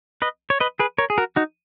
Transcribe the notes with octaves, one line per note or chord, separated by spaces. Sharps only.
B4 D#5
C#5
B4 D#5
G#4 B4
A#4 C#5
G#4
F#4 A#4
D#4 F#4